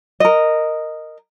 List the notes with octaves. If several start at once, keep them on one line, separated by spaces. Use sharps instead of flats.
A#4 D#5